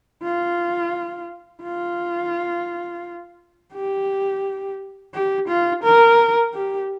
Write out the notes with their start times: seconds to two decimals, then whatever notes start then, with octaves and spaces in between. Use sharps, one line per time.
0.23 F4
1.62 F4
3.73 G4
5.14 G4
5.48 F4
5.84 A#4
6.54 G4